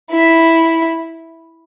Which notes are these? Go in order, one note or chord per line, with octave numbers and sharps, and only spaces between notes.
E4